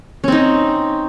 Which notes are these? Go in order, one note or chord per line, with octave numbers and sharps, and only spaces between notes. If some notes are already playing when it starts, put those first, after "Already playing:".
C4 C#4 D#4